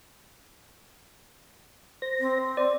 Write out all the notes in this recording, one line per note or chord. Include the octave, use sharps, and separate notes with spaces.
C5 A#6
C4
C5 D5